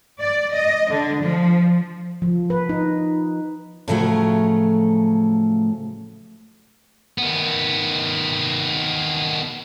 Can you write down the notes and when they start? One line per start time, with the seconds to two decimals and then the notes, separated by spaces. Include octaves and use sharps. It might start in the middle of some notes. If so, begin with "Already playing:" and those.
0.20 D5
0.53 D#5
0.91 D3
1.21 F3
2.22 F3
2.50 B4
2.69 D#4
3.88 A2 C#3 F3 F#3 A3
7.18 D#3 B3